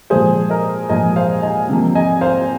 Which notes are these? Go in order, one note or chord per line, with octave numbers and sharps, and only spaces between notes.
A#2 F3 G#3 G#4 C5
A#4 D#5
A#2 F3 G#3 D#5 G#5
C5 F5
D#5 G#5
C3 F3 A#3
D#5 G#5
C5 F5